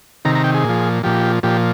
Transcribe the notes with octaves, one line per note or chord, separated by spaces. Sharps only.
C3 D#3 A#5
A#5
G5
G#4
A#2 F3
A#2 F3 G4
A#2 F3 G4